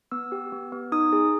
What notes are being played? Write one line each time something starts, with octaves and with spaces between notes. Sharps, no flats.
B3 E6
G4
B3
B3
D#4 D#6
G#4